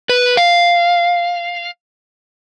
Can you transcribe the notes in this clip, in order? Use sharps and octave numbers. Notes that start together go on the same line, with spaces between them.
B4
F5